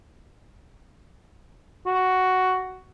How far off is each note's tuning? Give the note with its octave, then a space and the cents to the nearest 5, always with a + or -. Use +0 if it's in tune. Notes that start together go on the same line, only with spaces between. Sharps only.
F#4 +5